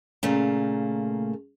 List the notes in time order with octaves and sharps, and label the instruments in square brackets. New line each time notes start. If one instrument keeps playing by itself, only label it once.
[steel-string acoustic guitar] A#2 C#3 A3 A#3